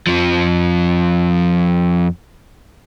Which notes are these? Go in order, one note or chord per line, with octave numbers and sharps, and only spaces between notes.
F2 F3